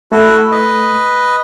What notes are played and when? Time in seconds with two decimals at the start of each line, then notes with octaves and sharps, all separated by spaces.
0.12 A3 E4 F#4 A4
0.37 E4
0.52 B4 D#5